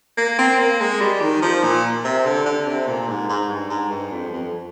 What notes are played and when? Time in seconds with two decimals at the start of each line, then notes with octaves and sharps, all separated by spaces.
0.17 A#3
0.39 C4
0.59 A#3
0.80 G#3
1.01 G3
1.21 D#3
1.42 F3
1.63 A#2
2.04 C3
2.25 D3
2.46 D3
2.66 C3
2.87 A#2
3.08 G#2
3.29 G#2
3.50 G2
3.70 G#2
3.91 G2
4.12 F2
4.32 F2